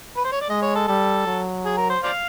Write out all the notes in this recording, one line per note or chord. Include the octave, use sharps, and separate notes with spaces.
B4
C5
C#5
D5
G#3 D#5
C#5
A4
G3 A4
F#3
G#4
A#4
C5
C5 D5 F5